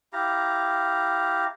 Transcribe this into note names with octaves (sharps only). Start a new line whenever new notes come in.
E4 G4 F5 A#5